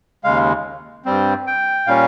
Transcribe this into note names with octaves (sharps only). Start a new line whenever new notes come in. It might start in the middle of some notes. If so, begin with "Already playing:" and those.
D#2 C#3 G#3 F5
G2 G3 C4
G5
A#2 G3 C#4 F5